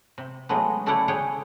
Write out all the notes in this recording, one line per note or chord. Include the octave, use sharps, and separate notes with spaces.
C3
F#3 G#3 A3 B3
C#3 A3 E4 C#5 D5 F#5
G#4 C#5 F#5 G5